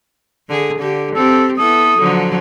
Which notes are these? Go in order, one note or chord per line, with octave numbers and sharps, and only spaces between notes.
D3 G#4
D3 G4
C4 G4 A4
B3 E4 A4 D#6
D3 F3 F#3